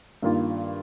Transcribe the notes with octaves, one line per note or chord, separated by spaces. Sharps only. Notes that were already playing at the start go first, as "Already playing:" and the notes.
G2 D#3 A#3 F4